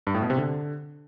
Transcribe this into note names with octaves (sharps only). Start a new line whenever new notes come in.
G2
A2
B2
C3
D3